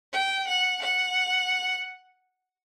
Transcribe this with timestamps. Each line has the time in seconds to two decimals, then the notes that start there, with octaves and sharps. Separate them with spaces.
0.13 G5
0.48 F#5
0.82 F#5